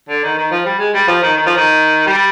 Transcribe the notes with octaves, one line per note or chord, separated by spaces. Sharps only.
D3
D#3
D#3
F3
G3
G#3
G3
F3
D#3
D#3
F3
D#3
G3